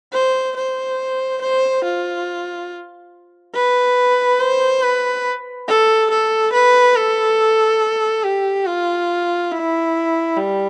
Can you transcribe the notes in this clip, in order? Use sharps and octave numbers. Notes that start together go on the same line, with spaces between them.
C5
C5
C5
F4
B4
C5
B4
A4
A4
B4
A4
G4
F4
E4
G3